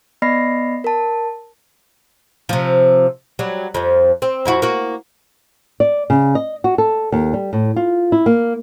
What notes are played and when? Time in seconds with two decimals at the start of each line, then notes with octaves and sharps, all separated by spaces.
0.22 B3 D5 D#5 B5 A#6 C7
0.84 A#4 A5
2.49 C3 F3
3.39 F#3 G3
3.74 F2 F3
4.22 C4
4.45 F2 E4 F#4
4.62 A#3 F#4
5.80 D5
6.10 C#3
6.35 D#5
6.64 F#4
6.78 A4
7.12 D#2
7.33 G3
7.53 A2
7.76 F4
8.12 E4
8.26 A#3